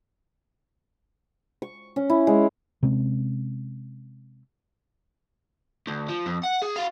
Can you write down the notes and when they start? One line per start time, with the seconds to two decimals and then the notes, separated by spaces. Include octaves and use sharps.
1.62 C#6
1.96 C#4
2.10 E4
2.27 G#3
2.83 C3 G#3 C4 C#4
5.87 D2
6.08 F3
6.26 F2
6.44 F#5
6.62 G#4
6.76 F#4 F5